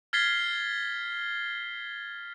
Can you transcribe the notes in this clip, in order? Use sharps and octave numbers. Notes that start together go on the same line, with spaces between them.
F6 G#6 A6 B6 C7 G7